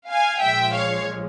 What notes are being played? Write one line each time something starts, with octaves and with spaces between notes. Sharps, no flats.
F5 G#5
A#1 A#2 F3 G#3 E5 G5
C#5 F5